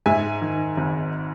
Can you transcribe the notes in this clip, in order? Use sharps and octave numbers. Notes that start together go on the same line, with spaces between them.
G#2 E5 G#5
D#3
G#1